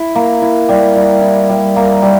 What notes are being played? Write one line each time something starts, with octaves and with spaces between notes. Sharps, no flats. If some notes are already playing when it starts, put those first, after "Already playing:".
Already playing: E4
A#3
E4
G3
G3
E4
G3
A#3
G3